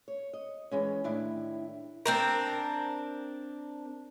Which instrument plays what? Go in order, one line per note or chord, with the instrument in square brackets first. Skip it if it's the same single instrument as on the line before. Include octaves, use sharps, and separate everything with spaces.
[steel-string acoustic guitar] C#5
D#5
E3 G#3 C#4
A2 D#3 D4 E4
[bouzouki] C4 D4 A#4